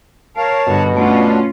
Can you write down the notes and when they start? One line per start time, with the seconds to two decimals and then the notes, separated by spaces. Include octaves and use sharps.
0.37 A#4 C#5 F5 A5
0.68 G2 B2 D3 F#4
0.97 A3 C#4 D4 F4 F#4